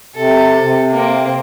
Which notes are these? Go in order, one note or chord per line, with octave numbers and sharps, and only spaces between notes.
C3 A4
C3
A#3 C4